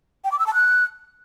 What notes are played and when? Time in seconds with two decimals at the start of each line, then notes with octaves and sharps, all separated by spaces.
0.24 G5
0.32 D6
0.39 E6
0.46 A5
0.54 F#6